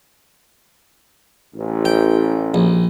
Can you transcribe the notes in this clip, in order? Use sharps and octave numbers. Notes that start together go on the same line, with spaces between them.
A1
G5
A#1